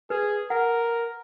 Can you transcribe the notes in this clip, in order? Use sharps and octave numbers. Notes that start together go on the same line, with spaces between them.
G#4 B4
A#4 F#5